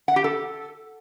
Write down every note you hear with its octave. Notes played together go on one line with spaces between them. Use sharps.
F#5
G4
A4